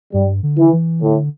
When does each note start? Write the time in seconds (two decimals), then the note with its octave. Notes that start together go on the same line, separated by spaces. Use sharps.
0.13 G2 G3
0.43 D3
0.58 E3
0.73 E3
1.02 A2 D3